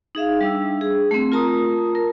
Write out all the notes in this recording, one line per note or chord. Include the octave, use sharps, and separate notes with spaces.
D#4 G#4 E5 F5
G3 D4 E6
G#4
A3 C4
F4 A#4 A5 A#5 D#6
A#4